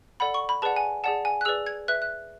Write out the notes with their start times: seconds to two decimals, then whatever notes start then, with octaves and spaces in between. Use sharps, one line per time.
0.20 A4 D5 F#5 B5
0.34 C#6
0.49 B5
0.62 G#4 B4 D5 F#5 A5
0.76 G#5
1.04 G#4 D5 F#5 A5
1.25 G#5
1.41 F#6
1.45 G#4 B4 D5 E6
1.66 G#6
1.88 B4 E5 F#6
2.02 F#6